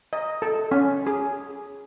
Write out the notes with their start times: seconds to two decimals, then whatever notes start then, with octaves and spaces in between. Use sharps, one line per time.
0.13 D#5
0.42 A4
0.72 C#4
1.07 G#4